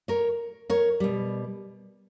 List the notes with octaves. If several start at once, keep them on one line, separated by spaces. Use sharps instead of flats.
A#4 C#5
A#4 C#5
B2 G3